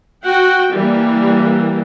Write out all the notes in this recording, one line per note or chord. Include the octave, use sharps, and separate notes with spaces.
F#4 F#5 G5
E3 G3 A#3